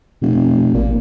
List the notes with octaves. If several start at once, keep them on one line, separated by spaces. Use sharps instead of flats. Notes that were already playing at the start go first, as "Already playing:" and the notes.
F1 B2
A1 A#2